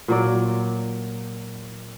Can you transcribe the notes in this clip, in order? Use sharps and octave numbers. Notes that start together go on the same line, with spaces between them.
A#2 F#3 D5